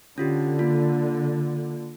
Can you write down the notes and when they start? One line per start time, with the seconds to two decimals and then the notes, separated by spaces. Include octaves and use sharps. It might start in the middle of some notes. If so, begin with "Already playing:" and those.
0.18 D3 C#4 F4 G4
0.59 A#3 F4